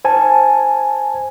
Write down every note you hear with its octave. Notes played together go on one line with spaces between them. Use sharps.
C5 G#5 A5